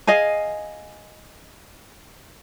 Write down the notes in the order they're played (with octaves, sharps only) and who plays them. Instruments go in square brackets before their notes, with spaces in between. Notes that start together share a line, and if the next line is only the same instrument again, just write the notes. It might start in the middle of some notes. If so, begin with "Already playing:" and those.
[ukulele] G#4 D#5 F5 G#5